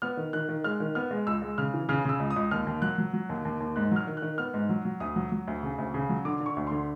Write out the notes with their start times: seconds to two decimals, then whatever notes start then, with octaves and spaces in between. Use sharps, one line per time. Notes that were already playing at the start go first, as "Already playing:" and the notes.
0.02 B3 F6
0.17 D#3
0.33 D#3 F#6
0.49 D#3
0.64 G#3 F6
0.80 D#3
0.95 B3 F6
1.11 G#3
1.27 C#2 E6
1.42 G#3
1.58 C#3 F6
1.74 E3
1.89 C#3 F6
2.05 C#3 E6
2.20 C#2
2.30 D#6
2.36 C#2
2.51 D#2 F6
2.67 D#2
2.82 F#3 F#6
2.98 F#3
3.13 F#3
3.29 D#2
3.45 D#2
3.60 D#2
3.76 G#2 F#6
3.91 F#3 F6
4.07 D#3
4.17 F#6
4.22 D#3
4.38 B3 F6
4.54 G#2
4.69 F#3
4.85 F#3
5.00 D2 D#6
5.16 F#3
5.32 F#3
5.48 D2
5.63 C#3
5.78 D2
5.94 C#3
6.09 F#3
6.25 D3 D6
6.41 D3
6.46 C#6
6.57 D2
6.67 D3 C6